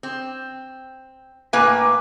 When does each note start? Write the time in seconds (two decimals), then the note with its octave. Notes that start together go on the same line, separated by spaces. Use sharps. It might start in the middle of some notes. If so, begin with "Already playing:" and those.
0.03 C4
1.53 A2 A#3 B4 F5 G#5